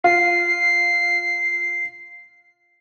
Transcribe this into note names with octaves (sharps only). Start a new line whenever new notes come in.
F4 C7